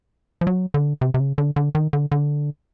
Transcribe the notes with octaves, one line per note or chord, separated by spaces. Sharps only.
F3
F#3
D3
C3
C3
C#3
D3
D3
D#3
D3
D3